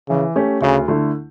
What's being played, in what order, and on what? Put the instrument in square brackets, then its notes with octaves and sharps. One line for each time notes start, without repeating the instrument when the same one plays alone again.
[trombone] C#3 [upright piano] E3
[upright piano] A3 C#4 G4
[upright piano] D2 [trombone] C#3
[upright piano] D3 A3 E4